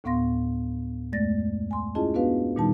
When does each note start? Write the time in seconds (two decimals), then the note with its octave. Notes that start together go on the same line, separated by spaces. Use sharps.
0.04 D2 A2 B3 F5 C6 A#6
1.13 F2 G#3 A3 D5 A6 A#6
1.71 G#5 C6
1.95 C#4 E4 F4 G#4 D#5 A5
2.14 B3 D4 F#4 B4 F5
2.56 A#2 D#3 G3 D#4 A5